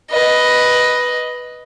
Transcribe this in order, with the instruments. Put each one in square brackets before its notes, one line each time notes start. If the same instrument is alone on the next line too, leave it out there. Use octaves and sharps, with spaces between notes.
[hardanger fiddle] B4 D#5